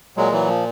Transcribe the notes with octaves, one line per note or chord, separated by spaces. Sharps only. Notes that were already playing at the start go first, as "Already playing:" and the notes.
A#2 F#3 G#3
E3 F#3
F3